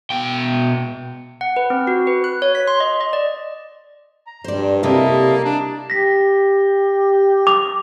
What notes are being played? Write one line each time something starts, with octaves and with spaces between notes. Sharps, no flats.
B2 G5
F#5
B4
C4
F#4
B4
F#6
C#5
B6
C6
D#5
D#5
D5
A#5
G2 C5 D5
C3 G3 A#3 E4 G4 A4 D#5
D4 A5
G4 A#6 B6
D6 F7